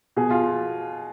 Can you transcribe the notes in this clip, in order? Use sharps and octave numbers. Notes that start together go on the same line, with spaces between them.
B2 G#4
F4